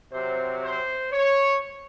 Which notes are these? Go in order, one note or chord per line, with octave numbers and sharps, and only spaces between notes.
C3 F#3 C4 C5
C5
C#5